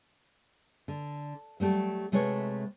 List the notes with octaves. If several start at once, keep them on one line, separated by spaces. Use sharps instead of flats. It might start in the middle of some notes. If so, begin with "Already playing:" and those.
D3
F#3 G3 A3 G4
C3 G#3 A3 F#4 B4 C#5